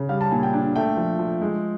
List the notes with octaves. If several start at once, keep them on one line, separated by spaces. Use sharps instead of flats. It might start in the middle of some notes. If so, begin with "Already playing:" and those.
Already playing: C#3
G3 F5
A5
A#2 G#5
G5
D4
A3 G5
F3
F3
G#3